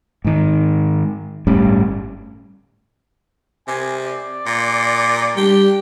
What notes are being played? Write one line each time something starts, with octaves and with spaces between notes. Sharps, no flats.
G#2 D#3
G1 A2 G3 C#4
C3 G#5
D5
A#2
G3 D4 G4